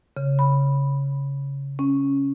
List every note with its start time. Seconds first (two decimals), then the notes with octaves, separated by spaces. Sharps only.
0.17 C#3
0.39 B5
1.79 C#4